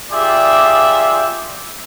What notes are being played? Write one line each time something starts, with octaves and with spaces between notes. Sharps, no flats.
F4 G4 G#4 D5 E5